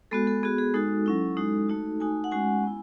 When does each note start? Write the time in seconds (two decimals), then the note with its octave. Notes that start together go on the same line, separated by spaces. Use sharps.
0.11 G#3 B3 F#4 A4
0.27 A4
0.43 B3 F#4 G#4
0.58 G#4
0.74 G#3 D#4 F#4 A4
1.06 F#3 C#4 E4
1.37 G#3 D#4 F#4
1.68 A3 D#4 F#4
2.00 A3 D#4 F#4 G#5
2.24 F#5
2.32 G#3 C#4 F#4 G#5
2.63 B3 E4